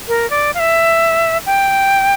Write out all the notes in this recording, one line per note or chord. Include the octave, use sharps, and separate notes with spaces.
A#4
D5
F5
E5
G5